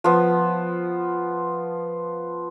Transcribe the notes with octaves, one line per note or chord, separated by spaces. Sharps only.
F3 B3